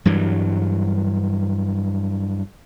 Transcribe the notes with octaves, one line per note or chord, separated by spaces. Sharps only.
G2 E3 F#3 G3